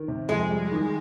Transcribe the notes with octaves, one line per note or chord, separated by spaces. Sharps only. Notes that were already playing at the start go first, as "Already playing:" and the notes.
Already playing: D#3
C3
F2 G#3
G3
D#3